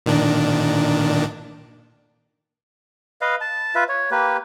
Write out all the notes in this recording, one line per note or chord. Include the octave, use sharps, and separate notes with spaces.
A#2 D#3 D4
B4 D#5 F5
A5
F4 B4 E5
C#5
A#3 G4 B4